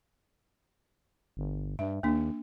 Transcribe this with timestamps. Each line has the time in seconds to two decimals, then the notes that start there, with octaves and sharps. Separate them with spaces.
1.37 G1
1.79 G2 E5
2.03 D#2 A#3 D4